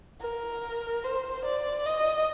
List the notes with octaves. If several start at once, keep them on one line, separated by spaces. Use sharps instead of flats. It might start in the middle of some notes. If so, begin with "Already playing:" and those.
A#4
C5
D5
D#5